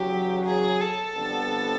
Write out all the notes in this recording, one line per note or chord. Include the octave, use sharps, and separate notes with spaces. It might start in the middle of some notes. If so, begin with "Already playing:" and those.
Already playing: E2 C#3 F#3 G4
G#4
A4
F2 D3 G3 B3